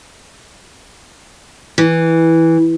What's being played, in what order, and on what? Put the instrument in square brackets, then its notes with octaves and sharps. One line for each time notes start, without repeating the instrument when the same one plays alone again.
[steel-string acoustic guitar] E3